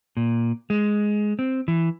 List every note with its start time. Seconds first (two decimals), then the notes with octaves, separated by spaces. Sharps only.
0.17 A#2
0.70 G#3
1.39 C4
1.68 E3